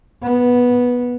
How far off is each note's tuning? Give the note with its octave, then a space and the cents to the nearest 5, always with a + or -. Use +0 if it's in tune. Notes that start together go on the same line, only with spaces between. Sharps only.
B3 -10